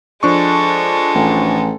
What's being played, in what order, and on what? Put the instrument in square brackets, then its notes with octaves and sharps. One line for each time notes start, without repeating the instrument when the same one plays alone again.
[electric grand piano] F3 D4 C#6 [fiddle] G#3 A4
[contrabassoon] A1